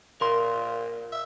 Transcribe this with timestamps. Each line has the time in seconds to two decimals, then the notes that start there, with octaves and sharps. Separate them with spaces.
0.21 A#2 A#4 C6
1.12 E5